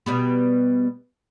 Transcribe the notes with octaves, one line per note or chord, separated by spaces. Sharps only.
B2 G3 B3